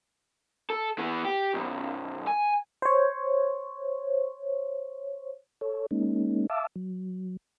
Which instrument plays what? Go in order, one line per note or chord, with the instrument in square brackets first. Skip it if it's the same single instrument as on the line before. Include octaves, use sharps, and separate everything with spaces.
[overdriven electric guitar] A4
E3 B3
G4
B1 F#2
G#5
[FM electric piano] C5 C#5
[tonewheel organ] A4 C#5
G#3 A#3 C#4 D#4
E5 F5 A5 D6 E6
F#3